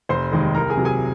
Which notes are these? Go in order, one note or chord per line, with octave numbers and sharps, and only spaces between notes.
F1 C5 C6
D#2 D#3 G#3
C2 A#4 A#5
G#4 G#5
C3 F#3
G#4 G#5